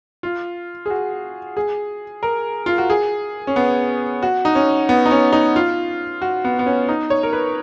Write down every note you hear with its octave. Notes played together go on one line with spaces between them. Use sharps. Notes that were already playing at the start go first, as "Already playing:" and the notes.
F4
G#4
F#4
G#4
A#4
F4
F#4
G#4
C#4
B3
F#4
D#4
C#4
B3
D#4
C#4
D#4
F4
F#4
B3
B3
C#4
D#4
C#5
A#4
B4